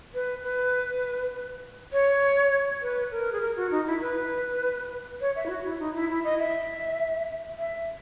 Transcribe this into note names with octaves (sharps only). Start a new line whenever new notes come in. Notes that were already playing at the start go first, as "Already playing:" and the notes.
B4
B4
C#5
B4
A#4
G#4
A#4
F#4
D#4
E4
B4
C#5
E5
E4
F#4
E4
D#4
E4
E4
D#5
E5
E5